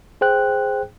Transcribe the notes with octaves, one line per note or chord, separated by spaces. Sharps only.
G#4 C5 G5 F#6